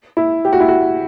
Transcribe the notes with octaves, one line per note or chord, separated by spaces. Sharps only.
E4
G4
F#4
E4
F#4